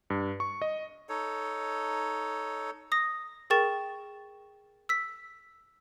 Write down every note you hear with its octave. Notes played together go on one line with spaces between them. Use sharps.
G2
C#6
D#5
D#4 A4 C#5
D#6 A#6
G#4 A#4 G5 C#6 A6 E7
E6 B6